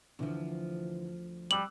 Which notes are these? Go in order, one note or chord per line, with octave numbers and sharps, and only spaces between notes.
D2 D3 E3 F3
G3 D6 E6 F#6 F#7